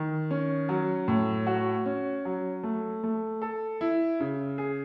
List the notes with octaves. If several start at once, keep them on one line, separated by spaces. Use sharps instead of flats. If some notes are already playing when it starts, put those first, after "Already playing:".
Already playing: D#3
C#4
F#3
A2
F#4
C#4
F#3
A3
A3
A4
E4
C#3
G#4